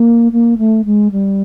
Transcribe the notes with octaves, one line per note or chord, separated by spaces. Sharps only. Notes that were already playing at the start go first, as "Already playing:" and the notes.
Already playing: A#3
A#3
A3
G#3
G3